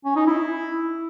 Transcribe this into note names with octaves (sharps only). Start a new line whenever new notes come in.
C#4
D#4
E4